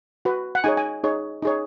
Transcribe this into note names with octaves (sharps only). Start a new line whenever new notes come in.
F#4 B4
F#5
D#4 G#4 C#5 G#5
G#5
D#4 G#4 C#5
D#4 G#4 C#5